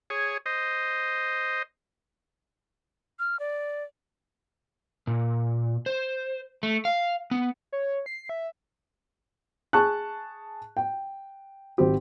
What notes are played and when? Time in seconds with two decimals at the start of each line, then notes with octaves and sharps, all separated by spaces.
0.10 G#4 C#5
0.46 C5 D#5
3.19 F6
3.40 D5
5.07 A#2
5.86 C5
6.63 A3
6.85 F5
7.31 B3
7.73 C#5
8.06 C7
8.29 E5
9.73 G#4 A5 C#6 F#6
10.77 G5
11.78 G#1 C4 G4